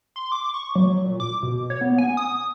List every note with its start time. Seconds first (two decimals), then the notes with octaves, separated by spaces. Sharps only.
0.16 C6
0.32 D6
0.54 C#6
0.75 F#3
1.04 A#2
1.20 D6
1.43 B2
1.70 C#5
1.81 B3
1.98 G#5
2.17 D#6